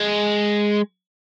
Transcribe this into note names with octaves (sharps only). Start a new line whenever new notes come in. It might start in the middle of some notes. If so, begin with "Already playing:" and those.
Already playing: G#3